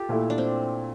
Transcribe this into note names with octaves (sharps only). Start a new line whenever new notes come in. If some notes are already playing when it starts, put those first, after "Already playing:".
Already playing: F4 G4 A4
A#2 A3 E4
D4
C4